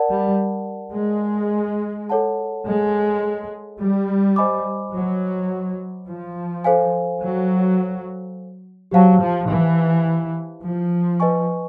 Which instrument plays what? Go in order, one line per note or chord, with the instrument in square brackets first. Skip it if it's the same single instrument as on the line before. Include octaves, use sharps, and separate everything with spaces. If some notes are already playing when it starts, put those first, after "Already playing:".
Already playing: [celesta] A#4 D5 F#5 A5
[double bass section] G3
G#3
[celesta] A4 C#5 F#5 A5
[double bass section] G#3
G3
[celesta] C5 D#5 G#5 B5 D6
[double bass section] F#3
F3
[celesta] A4 C5 F5 G#5
[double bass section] F#3
[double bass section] F#3 [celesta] G4 C5 F5 A5
[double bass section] F3
E3
F3
[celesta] B4 D#5 G#5 C#6